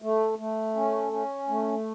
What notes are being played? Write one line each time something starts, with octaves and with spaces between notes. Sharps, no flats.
A3
A3
C#4
C#4
A3